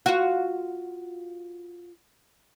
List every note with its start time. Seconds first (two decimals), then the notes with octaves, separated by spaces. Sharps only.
0.06 F4 F#4